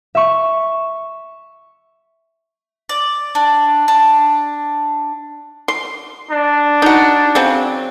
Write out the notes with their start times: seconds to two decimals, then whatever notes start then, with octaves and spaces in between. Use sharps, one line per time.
0.15 E5 C#6
2.89 D5
3.35 D4
3.88 D4
5.68 C6
6.31 D4
6.82 D#4 F#4
7.35 C#3 F#3 C4